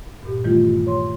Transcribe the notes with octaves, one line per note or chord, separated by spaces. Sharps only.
G2 A#2 G4
D#3 E3 G3 A3 E4 F4
G2
C#5 C6